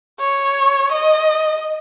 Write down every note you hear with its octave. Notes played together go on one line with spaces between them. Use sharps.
C#5
D#5